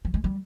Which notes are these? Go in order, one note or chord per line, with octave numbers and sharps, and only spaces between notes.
F3
G#3
G3